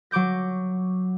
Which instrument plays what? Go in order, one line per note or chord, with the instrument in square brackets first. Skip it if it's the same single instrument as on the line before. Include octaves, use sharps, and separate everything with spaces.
[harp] F#3 C#6 D6 G6 A#6